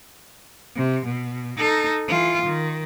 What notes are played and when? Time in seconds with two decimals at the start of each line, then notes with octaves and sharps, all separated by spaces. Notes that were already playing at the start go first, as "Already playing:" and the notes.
0.76 C3
1.06 B2
1.58 D#4 A4
2.08 E3 F4
2.46 D#3